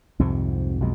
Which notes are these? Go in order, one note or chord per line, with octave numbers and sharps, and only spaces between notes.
C2 F2 G#2 C3
B1 F2 B2 G#3